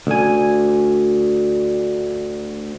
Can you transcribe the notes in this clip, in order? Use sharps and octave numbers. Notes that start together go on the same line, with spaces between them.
D2 G#5